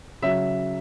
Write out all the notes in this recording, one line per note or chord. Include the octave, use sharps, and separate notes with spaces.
C#3 F#3 E5